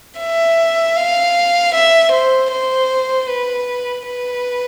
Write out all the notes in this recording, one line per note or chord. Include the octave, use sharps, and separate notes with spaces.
E5
F5
E5
C5
C5
B4
B4